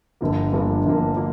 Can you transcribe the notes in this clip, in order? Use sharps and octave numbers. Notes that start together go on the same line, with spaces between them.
G1 G2 D3 F3 A#3
G1 G2 D3 F3 A#3
G1 G2 D3 F3 A#3
F3 A#3